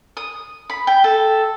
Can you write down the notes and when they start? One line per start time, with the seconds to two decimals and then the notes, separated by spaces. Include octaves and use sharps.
0.17 D#6
0.70 B5
0.87 G5
1.04 A4